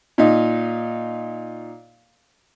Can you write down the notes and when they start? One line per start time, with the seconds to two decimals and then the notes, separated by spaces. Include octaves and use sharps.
0.18 A#2 D#4